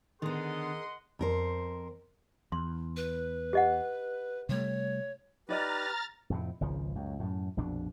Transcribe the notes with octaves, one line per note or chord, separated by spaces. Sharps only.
D3 D#3 B3 G#4 A#4 D#5 F#5 C6
F2 A#4 C5
E2 C6
B4
G4 D#5 F#5
C3 G3 A3 C#5
D#4 G4 B4 D5 D#5 A#5 F6 A6
F2 A2 C3
G#1 C#2 C#3 F3
C#2 F#2
F#2 A2
A#1 F2 B2 D4